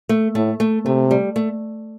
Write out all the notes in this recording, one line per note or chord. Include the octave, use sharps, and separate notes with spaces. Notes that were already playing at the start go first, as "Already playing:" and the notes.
A3
A2 A3
A3
C3 A3
G3
A3